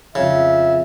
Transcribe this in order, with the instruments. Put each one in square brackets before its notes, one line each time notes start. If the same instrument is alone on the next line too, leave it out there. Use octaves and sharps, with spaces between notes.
[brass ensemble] F2 F4 E5 [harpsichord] C#3